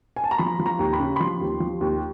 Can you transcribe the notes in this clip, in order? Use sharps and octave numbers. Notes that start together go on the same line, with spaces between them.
G#5
A5
A#5
F3 B5
F3
A#5
D#2
B5
C#3
B5
F3 C6
D#2
F3
D#2